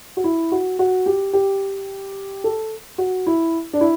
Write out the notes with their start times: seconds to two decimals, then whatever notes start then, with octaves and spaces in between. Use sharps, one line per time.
0.17 F#4
0.24 E4
0.52 F#4
0.79 F#4
1.06 G4
1.33 G4
2.44 A4
2.98 F#4
3.26 E4
3.73 D4
3.81 E4